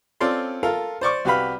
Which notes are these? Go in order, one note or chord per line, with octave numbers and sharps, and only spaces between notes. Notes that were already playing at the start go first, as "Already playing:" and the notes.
C4 C#4 F4 A4 D5 C6
F4 A4 A#4 F5
C5 D5 C#6 D6
C2 F#4 G4 B4 F5 B5